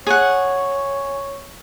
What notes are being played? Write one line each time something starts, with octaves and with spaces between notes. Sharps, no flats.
G#4 C#5 F#5